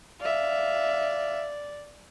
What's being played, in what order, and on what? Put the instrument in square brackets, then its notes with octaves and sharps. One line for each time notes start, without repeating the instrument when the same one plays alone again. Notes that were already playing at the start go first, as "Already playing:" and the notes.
[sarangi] D5 [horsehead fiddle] E5 F5